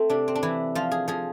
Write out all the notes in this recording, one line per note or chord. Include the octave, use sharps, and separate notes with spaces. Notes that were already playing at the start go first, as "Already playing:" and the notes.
Already playing: A3 C4
C3 D4
C4
D4
E3 E4
F3 F4
G#4
F3 G#4